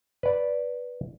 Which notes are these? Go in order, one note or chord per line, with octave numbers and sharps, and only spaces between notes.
B4 D5